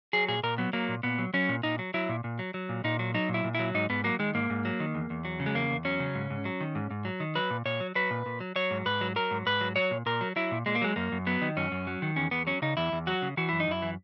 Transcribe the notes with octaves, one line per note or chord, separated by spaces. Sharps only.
F#3 G#4
A#2 G#4
A#2 A#4
F#3 B3
F#3 A#3
A#2
A#2 B3
F#3
F#3 C#4
A#2
A#2 D#4
F#3
F#3 E4
A#2
A#2
F#3
F#3
A#2
A#2 D#4
F#3
F#3 D#4
A#2
E4
A#2
F#3 E4
G#2 D#4
G#2 B3
F#3 A#3
D#3 G#3
G#2 A#3
G#2
F#3
D#3
E2
E2
F#3
C#3
G#3
E2 A#3
E2
F#3 C#4
C#3
G#2
G#2
F#3
D#3
G#2
G#2
F#3
D#3
F#3 B4
A#2
A#2 C#5
F#3
F#3 B4
A#2
A#2
F#3
F#3 C#5
G#2
G#2 B4
F#3
F#3 A#4
G#2
G#2 B4
F#3
F#3 C#5
A#2
A#2 A#4
F#3
F#3 E4
A#2
A#2 G#3
A#3
F#3 G#3
F#2 A#3
F#2
F#3 B3
D#3
F#2 C#4
F#2
F#3
D#3
E2 C#4
E2 B3
F#3 C#4
C#3 D#4
E2 E4
E2
F#3 F#4
C#3
E3 F#4
F#2 E4
D#4
F#2 E4
E3